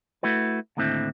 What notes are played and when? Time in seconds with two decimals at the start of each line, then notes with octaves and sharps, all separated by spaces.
0.23 A3 E4 F#4 B4
0.77 D#2 A2 D3 C4 E4